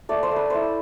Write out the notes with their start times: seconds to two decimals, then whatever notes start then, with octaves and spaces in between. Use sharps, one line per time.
0.09 A3 D5
0.23 C5
0.31 A3 B4
0.50 E4 C5